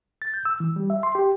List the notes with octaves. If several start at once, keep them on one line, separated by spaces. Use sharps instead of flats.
A6
G6
E6
E3
G3
E5
C6
G4